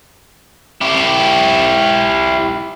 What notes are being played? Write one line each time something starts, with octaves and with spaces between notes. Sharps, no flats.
E4 G4